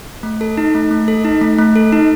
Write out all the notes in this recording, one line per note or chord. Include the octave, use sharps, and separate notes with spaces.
A3
A4
D#4
A3
A3
A4
D#4
A3
A3
A4
D#4